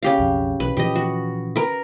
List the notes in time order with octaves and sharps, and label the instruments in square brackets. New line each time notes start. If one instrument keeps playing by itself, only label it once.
[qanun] C#3 G4 F5
[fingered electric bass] B1 F2
[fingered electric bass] B1 E3 [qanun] B4
[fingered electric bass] A#2 E3 F3 [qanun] G4 D#5
[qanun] F#4
A#4 B4